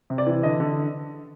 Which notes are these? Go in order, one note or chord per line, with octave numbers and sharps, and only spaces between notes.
C3
D5
E3
D3 D#5
D3